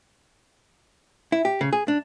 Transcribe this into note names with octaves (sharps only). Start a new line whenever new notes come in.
E4
G4
C#3
G#4
D4